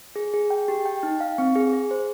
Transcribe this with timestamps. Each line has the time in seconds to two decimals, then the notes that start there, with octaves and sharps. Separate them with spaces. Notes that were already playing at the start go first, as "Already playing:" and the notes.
0.16 G#4
0.34 G#4
0.50 G5
0.68 G4
0.85 G5
1.03 D#4
1.21 F5
1.38 C4
1.56 G#4
1.73 G#4
1.91 C5